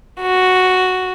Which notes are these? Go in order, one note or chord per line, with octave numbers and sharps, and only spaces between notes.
F#4